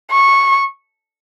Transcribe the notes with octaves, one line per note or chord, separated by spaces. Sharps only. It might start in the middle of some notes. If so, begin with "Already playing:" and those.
C#6